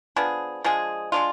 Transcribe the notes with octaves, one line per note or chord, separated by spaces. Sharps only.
F3 B3 D4 G#4
F3 G#3 D4 G#4
G#3 D4 F4